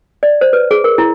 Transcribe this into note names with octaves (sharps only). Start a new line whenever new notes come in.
D5
C5
B4
G#4
A#4
E4